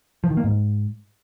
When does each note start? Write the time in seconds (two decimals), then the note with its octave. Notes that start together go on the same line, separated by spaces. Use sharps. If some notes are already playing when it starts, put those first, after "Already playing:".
0.24 F3
0.30 D#3
0.37 A#3
0.44 G#2